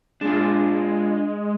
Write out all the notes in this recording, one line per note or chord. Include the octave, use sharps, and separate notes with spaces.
G#3 D4 F4